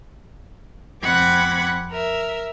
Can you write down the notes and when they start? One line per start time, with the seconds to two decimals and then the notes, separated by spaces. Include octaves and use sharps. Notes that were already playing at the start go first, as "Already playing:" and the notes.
1.01 F2 C4 F#5 B5 D6 G#6
1.91 A#4 E5